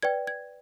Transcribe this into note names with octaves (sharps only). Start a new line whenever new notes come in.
B4 D5 G5 G#6
G#6